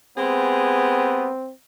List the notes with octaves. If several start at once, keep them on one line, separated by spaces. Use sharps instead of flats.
G#3 B3 C4 G4 G#4